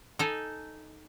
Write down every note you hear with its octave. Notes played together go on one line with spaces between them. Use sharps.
D#4 A4 G#5